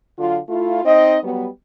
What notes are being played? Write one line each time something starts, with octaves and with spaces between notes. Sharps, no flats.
D3 F#3 F4
A3 E4 F4
C4 D#4 D#5
F#3 G3 B3